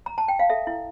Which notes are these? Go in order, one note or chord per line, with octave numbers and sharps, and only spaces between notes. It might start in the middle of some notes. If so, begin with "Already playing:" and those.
A#5
A5
G5
F5
A4 E5
E4